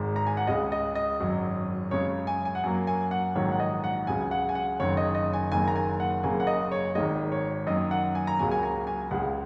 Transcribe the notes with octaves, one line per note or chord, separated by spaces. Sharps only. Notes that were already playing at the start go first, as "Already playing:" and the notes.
Already playing: G#1 G#2 G#3
A#5
G#5
F#5
C#2 C#3 G#3 D#5
D#5
D#5
G#1 F#2 F#3
F#2 C#3 G#3 C#5
G#5
G#5
F#5
F#2 F#3 A#3 G#5
G#5
F#5
A#1 G#2 D#3 F#3 C#5
F#5
D#5
F#5
C#2 C#3 F#3 G#5
F#5
G#5
F#5
F#1 F#2 D#3 C#5
D#5
D#5
G#5
F#1 F#2 D#3 A#3 G#5
A#5
G#5
F#5
F#1 F#2 C#3 A#3 G#5
F#5
D#5
C#5
G#1 G#2 D#3 G#3 D#5
C#5
F#2 D#3 A#3 D#5
F#5
G#5
A#5
C#2 C#3 F#3 A#3 G#5
G#5
A#5
G#5
C#2 C#3 G#3 F#5